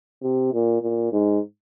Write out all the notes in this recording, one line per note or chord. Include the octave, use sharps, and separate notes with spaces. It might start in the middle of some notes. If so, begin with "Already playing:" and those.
C3
A#2
A#2
G#2